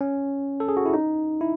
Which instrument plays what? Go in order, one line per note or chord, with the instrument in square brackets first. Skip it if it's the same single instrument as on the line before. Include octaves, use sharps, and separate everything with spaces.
[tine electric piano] C#4
A4
G#4
F#4
E4
D#4
E4